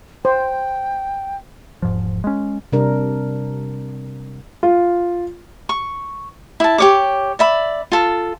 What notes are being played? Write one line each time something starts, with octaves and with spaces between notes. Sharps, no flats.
C5 G5
E1 G#2 F3
G#3 C#4
C3 G3 D4 A#4
F4
C#6
E4 A5
G4 C#5 D6
D5 E5 B5
F4 A4